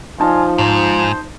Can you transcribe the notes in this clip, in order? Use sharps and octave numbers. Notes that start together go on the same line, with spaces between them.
F3 D4 D#4 F4 G#5 A5
G#2 C5